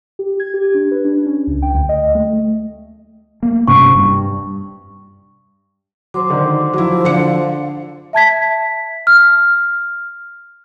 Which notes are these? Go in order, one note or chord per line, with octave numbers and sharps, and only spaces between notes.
G4
G#6
G4
D4
B4
D4
C#4
C#2
G5
D2
D#5
A3
A3 A#3
G2 C3 C#4 C#6
G2
F#3 C5 C6 D6
D3 D#3
F3 F#3 E4
D3 D4 C#7
E5 A5 G#6 B6
F6